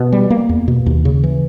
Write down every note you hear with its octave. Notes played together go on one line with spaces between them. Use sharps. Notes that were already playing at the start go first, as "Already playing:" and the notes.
Already playing: B2
G3
A#3
E2
B2
D#2
C#3
E3